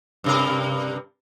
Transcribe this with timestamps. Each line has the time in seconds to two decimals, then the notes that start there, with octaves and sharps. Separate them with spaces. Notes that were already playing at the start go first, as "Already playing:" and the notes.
0.24 G2 C3 A#4